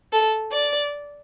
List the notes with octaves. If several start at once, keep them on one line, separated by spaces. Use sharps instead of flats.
A4
D5